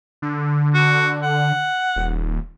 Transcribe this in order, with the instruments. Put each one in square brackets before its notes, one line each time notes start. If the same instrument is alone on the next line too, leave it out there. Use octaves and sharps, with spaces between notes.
[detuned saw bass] D3
[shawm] F#4
F#5
[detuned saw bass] D#1